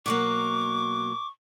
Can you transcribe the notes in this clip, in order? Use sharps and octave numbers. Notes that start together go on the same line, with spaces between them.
B2 F#3 A#3 C#6 D6